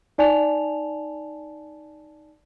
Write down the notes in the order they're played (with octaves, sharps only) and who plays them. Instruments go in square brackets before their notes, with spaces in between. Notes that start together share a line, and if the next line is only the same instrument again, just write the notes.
[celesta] D#4 D5 G#5 A5 F7